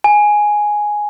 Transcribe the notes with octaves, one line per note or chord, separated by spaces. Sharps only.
G#5